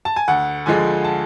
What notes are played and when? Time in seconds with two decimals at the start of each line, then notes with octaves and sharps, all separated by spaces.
0.05 A5
0.16 G#5
0.28 D2 F#5
0.66 D3 F3 G#3 G#5
1.04 A5